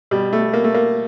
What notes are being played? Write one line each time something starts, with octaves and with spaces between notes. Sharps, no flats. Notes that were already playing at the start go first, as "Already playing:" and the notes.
B2 G3
A3
A#3
A3
A#3